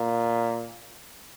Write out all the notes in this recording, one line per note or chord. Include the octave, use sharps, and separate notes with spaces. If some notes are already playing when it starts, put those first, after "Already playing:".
Already playing: A#2